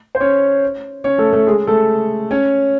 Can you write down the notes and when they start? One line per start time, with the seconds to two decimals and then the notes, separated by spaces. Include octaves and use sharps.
0.15 C5
0.20 C#4 C#5
1.04 C#4 C#5
1.18 A3 A4
1.33 A3 A4
1.47 G#3 G#4
1.67 A3 A4
2.31 C#4 C#5